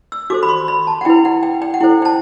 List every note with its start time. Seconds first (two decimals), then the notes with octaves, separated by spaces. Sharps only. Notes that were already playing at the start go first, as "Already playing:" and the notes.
0.12 E6
0.30 F#4 A4 C5 D6
0.43 B5
0.49 C6
0.68 B5
0.87 A5
1.01 F#5
1.05 E4 B4 G5
1.25 F#5
1.43 G5
1.62 G5
1.74 F#5
1.80 E4 A4 C5 G5
2.02 G5
2.05 A5